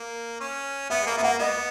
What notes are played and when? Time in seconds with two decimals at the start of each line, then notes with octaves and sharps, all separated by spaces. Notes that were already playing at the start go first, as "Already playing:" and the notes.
Already playing: A#3
0.40 C#4
0.90 B3 E5
1.02 G#3
1.07 A#3
1.17 B3 E5
1.23 A#3 F#5
1.39 B3 D#5